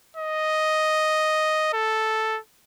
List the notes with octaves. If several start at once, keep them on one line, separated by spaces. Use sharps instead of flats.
D#5
A4